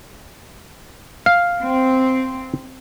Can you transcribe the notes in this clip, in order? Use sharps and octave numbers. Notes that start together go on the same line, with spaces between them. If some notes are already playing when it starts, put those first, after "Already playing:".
F5
C4